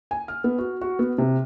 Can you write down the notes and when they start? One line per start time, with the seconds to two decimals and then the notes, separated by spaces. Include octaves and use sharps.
0.11 G#5
0.28 F6
0.44 B3
0.59 F#4
0.81 F#4
0.99 B3
1.18 C3